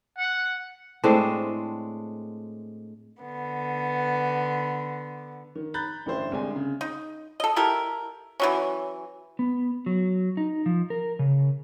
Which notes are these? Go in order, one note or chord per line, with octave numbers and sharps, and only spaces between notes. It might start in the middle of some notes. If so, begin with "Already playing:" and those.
F#5
A2 G#3 C4 D4
D3 B3
D#3
A#5 B5 F#6 G6 A6
A1 G2 D3 E4 C5
C2 D3 G#3 G#5
C#3
D#4
A4 D#5
E4 G4 A4 A#4
E3 F#3 C#4
B3
F#3
D#4
F3
A#4
C#3